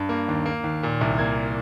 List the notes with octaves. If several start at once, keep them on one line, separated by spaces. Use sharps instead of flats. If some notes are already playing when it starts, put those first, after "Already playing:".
Already playing: G2
A#3
D#2
A#3
D#2
A#2
C2
A#3 G#6